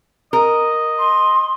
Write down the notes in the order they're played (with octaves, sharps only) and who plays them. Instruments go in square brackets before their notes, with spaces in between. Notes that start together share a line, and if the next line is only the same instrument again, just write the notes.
[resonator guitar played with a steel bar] A#4 [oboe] D#5
[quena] C6